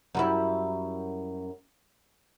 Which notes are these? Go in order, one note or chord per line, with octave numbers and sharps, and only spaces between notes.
F#2 G3 E4